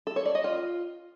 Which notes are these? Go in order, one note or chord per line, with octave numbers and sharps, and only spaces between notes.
A4
C#5
D5
D#5
F4